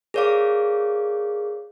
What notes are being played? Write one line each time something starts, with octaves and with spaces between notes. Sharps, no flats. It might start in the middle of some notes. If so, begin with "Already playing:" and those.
G#4 A#4 C#5 D5 F5 D6